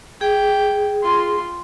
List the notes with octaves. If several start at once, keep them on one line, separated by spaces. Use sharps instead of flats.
G#4 G5
F4 C6